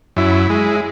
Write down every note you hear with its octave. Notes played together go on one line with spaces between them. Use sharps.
F#2 E4
G#3